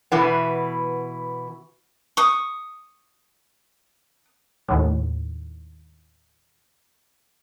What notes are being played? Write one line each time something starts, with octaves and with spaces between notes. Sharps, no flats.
B2 E3 B3
C#6 D#6
D#2 A2